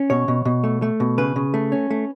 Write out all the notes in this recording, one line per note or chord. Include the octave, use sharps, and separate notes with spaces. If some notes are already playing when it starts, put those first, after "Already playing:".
Already playing: C#4
B2 C#5
B2
B2
A3
A3
B2
C#3 B4
C#3
A3
C#4
A3